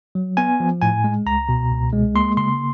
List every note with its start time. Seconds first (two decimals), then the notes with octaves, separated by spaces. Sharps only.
0.15 F#3
0.37 B3 G#5
0.60 F3
0.82 A2 G#5
1.04 G#3
1.26 C#2 A#5
1.49 B2
1.70 C#2
1.93 G#3
2.15 A#3 C6
2.37 C#3 C6